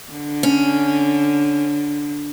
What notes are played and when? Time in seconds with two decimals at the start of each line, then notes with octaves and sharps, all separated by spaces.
0.11 D3
0.43 C#4